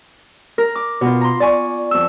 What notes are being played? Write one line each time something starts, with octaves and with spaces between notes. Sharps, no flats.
A#4
D6
B2 F4
A#5 C6
D5 G#5 C#6
F2 E6